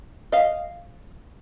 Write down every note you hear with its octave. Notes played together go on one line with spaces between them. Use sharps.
D#5 F5